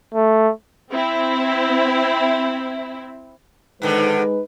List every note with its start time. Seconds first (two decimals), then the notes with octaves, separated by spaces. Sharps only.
0.14 A3
0.91 C4 E4
3.82 G#2 D3 D#3 G#3 D#4 B4